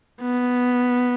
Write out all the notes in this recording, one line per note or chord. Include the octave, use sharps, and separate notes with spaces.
B3